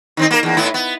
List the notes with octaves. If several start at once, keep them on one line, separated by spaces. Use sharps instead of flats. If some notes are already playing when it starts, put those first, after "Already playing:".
D#3 C4 D#4
A#3 A#4
E2 A#3
A2 B3 E4
B3